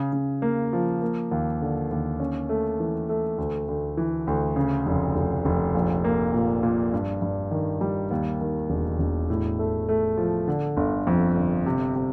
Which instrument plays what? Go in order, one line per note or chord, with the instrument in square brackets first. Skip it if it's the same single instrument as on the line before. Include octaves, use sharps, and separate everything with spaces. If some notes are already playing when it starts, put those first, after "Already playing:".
Already playing: [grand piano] C#3
C#3
A#3
F3
A#3
D#2
D3
D#2
C#4
A3
E3
A3
D2
D2
E3
D2
C#3
F1
F1
F1
A#1
A#3
A#2
A#2
G2
G2
D#3
G3
D#2
D#3
E1
E1
A2
A3
A3
F3
D3
G1
F2
G1
C3
C3